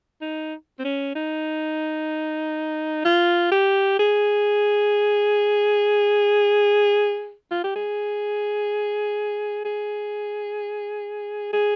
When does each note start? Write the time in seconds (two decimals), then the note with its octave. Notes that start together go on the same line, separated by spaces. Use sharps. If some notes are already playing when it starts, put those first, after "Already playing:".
0.21 D#4
0.79 C4
0.84 C#4
1.15 D#4
3.05 F4
3.52 G4
3.99 G#4
7.51 F4
7.64 G4
7.76 G#4
9.65 G#4
11.53 G#4